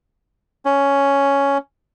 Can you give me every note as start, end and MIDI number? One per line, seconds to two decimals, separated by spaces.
0.65 1.58 61